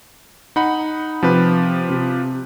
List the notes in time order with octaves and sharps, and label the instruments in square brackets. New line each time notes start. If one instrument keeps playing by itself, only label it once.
[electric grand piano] D#4 F#5 B5
[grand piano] C3 [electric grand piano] F3 G4 B4
[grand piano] C3